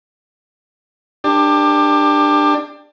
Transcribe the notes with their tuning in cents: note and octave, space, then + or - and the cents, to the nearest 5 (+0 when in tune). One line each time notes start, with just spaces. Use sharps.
D4 +20 G4 +30